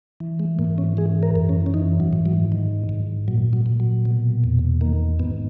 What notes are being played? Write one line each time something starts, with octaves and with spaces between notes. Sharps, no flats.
E3
G#3
G#2 A#3
C#4
E3 G#4
A#4
F#2
C#4
C#4
E3 D#4
F#3
G#2
F#3
D#3
G#2
A#2 F#3
F#3
A#2
F#3
B2
E2
D#3 A#3
G#2 B3